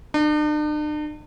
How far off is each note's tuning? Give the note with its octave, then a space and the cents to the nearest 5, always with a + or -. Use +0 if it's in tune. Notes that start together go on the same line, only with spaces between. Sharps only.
D4 +45